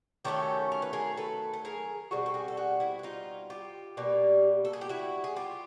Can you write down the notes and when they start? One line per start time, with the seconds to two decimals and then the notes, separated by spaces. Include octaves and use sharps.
0.25 D#3 F#3 A3 C#4 G4 A4
0.72 A#4
0.82 B4
0.93 G#4 A#4
1.17 A4 B4
1.53 A4
1.65 G#4 A#4
2.11 B2 G3 C4 F#4 G#4
2.26 A4
2.34 F#4 G#4
2.48 A4
2.57 F#4 G#4
2.80 E4 F#4
2.99 F#4
3.03 D#4 F4
3.50 F4 G4
3.97 B2 G3 A#3
4.65 A4
4.73 G#4
4.81 G4
4.89 E4 F#4
5.24 G#4
5.36 F4 G4